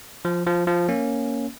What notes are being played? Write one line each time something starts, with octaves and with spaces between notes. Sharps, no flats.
F3
F3
F3
A#3 C#4